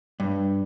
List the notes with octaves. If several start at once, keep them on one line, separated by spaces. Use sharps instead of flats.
G2